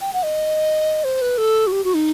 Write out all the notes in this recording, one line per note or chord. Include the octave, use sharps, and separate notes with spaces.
G5
F#5
D#5
C5
B4
A4
F#4
G4
F#4
D#4